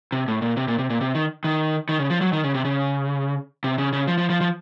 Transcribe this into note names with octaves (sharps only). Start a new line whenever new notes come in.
C3
A2
A#2
C3
A#2
C3
A#2
C3
D#3
D#3
D#3
C#3
F3
F#3
D#3
C#3
C3
C#3
C3
C#3
C#3
F3
F3
F3
F3